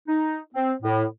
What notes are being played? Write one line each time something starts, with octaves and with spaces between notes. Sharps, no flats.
D#4
C4
A2